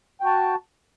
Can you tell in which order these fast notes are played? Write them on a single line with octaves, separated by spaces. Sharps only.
G5 F#4 A5